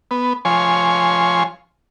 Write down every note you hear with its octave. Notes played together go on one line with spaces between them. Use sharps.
B3
F3 C#5 G#5 C6